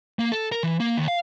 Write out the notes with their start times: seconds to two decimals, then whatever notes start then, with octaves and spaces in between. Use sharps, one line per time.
0.19 A#3
0.32 A4
0.52 A#4
0.63 E3
0.80 A#3
0.97 D#2
1.08 F5